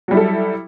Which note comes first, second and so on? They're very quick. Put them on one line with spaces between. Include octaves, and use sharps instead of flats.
F#3 G3 E4 A4